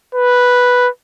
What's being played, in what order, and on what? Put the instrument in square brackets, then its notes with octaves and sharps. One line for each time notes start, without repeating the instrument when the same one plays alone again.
[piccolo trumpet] B4